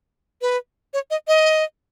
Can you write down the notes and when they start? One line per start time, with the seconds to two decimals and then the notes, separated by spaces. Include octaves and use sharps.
0.42 B4
0.94 C#5
1.11 D#5
1.28 D#5